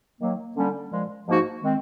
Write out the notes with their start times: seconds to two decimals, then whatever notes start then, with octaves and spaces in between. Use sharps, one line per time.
0.20 D#3 F#3 A#3
0.56 D3 G3 A#3 C#4
0.91 A#2 F3 G#3
1.27 G#2 F3 A#3 D#4 F#4
1.62 D#3 G#3 C4